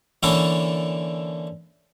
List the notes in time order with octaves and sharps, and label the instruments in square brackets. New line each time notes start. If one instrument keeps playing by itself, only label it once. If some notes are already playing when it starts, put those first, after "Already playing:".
[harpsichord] D3 E3 A#3 C#4 A4 C#5